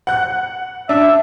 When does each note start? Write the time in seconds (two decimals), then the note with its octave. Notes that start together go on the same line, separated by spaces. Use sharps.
0.07 F#5 F#6
0.89 D4 E5